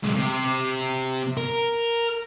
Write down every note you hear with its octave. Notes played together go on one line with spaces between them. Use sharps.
B1 G#3
C3
A#4